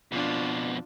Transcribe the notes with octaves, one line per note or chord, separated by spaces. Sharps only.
F2 B2 D4 F4